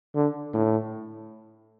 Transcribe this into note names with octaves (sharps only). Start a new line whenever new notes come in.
D3
A2